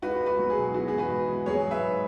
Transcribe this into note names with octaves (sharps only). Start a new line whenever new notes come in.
C#2 F#4 B4
C#2
F#4 B4
F#3
G#4
B2
E3 F#4
G#2 G#4
F#4 B4
G#2
E3
F#3 G#4 C#5
G#2
B4 E5
G#2